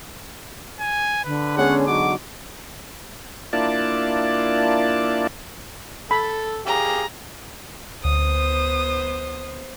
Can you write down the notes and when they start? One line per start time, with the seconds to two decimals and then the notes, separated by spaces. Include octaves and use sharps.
0.80 G#5
1.25 D3 B4
1.57 G#3 B3 C#4 G#4 F#5
1.87 F#3 D#4 F#4 D6
3.53 A#3 D4 E4 F4 D5 A5
6.11 A4 B5
6.67 G4 G#4 F5 A#5
8.05 D2 B3 C5 D#6